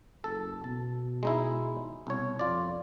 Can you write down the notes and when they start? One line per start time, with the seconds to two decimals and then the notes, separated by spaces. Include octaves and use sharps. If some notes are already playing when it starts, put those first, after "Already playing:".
0.24 F#1 A4
0.64 B2 A5
1.23 G#3 D#4 E4
2.07 C2 B2 C#5
2.39 F2 F4 D5